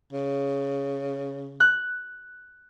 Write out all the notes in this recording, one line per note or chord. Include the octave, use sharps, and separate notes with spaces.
C#3
F#6